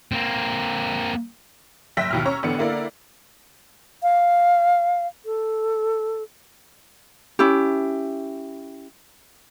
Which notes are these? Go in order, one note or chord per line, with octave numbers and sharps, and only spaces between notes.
A#3 C4
F#1 E5 G5 E6 A#6 B6
D#2 B2 F6
C#4 C#5 A#5 C#6 E6
A1 D3 B3 C#7
D3 A#3 E4 A#4 D5
F5
A4
C#4 E4 G4